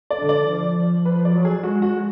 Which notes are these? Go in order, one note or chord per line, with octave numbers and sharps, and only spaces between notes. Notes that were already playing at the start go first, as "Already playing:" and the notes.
D5
D3
D5
F3
F3
F3 B4
D5
F#3
G#4
G#3 F#4
F#4